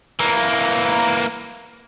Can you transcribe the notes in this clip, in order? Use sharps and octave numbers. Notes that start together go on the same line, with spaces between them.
E3 A#3